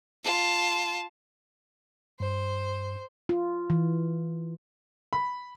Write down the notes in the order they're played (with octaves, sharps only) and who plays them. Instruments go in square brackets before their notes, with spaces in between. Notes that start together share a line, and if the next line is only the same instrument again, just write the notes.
[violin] F4 A5
[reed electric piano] G2 [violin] C5
[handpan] F4
E3
[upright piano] B5